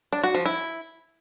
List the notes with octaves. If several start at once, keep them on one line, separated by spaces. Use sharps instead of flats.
D4
F#4
F3
E4